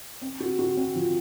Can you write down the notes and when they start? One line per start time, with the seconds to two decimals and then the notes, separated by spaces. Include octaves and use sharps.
0.21 C4
0.40 F#4
0.59 F#4
0.77 C4
0.95 F3